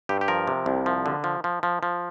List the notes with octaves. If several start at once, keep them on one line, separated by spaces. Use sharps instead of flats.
G2 G4
G4
F3 A#4
C3
C2
F3
D3
F3
F3
F3
F3